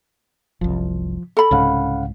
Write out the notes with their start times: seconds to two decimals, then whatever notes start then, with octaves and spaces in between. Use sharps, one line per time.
0.61 F#1 C2 F3
1.37 A4 B5
1.51 C2 G#2 C#3 C#4 F5 F#5